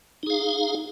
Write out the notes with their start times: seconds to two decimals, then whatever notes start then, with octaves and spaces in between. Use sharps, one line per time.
0.23 D#4
0.26 G#4
0.30 F5